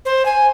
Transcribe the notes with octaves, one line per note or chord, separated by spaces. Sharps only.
C5
G#5